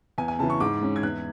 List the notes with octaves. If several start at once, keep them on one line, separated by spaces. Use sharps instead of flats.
E2 G#5
G#5
C#3 E3 A5
C#6
G#2 D6
G#3 C#4
G#6
E2 F#6